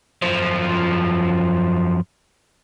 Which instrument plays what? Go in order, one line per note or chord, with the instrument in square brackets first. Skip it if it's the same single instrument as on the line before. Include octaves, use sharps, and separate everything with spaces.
[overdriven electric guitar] F#2 F3